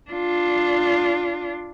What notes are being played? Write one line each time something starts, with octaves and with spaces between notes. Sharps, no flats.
D4 F4